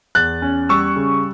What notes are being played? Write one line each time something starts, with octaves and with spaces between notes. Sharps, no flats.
E2 F#6 A6
C#4
G3 C#6 E6
C#3